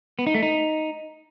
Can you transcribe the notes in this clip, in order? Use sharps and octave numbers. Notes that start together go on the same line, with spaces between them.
B3
D#4
A3
D#4